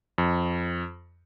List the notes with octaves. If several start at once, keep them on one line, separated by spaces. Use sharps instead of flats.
F2